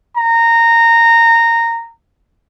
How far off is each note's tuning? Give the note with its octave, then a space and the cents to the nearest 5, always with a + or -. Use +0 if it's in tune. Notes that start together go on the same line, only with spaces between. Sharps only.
A#5 -15